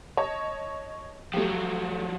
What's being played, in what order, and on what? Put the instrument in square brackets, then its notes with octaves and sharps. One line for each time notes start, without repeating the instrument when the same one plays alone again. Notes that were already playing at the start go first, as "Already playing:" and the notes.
[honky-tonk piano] C#5 D#5 A5
[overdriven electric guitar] F3 F#3 [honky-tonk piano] A3 G4